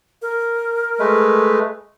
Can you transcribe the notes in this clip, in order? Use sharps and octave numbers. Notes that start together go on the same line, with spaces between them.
A#4
G#3 A3 B4